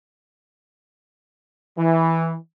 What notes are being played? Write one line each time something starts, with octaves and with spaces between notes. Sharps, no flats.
E3